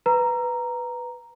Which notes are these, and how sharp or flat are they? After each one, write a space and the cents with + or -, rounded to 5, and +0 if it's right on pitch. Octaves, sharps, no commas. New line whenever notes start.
B4 +5 A#5 +0